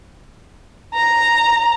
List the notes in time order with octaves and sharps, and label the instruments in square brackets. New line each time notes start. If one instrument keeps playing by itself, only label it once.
[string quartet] A#5